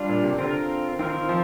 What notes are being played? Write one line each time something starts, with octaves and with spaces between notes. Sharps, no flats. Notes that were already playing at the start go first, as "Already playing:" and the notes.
Already playing: G3 D4 F4
A#2
C3
D3 C4 F4 A#4
D#3 C4 F4 A#4
F3